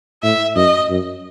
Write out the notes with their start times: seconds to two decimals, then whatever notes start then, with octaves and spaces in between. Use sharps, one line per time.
0.23 A2 E5
0.56 F#2 D#5
0.89 F#2